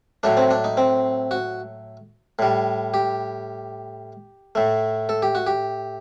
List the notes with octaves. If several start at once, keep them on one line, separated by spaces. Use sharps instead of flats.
A2 F#3 A3 D4
C4
D4
D#4
C4
F#4
A2 G3
G4
A2 A3
A4
G4
F#4
G4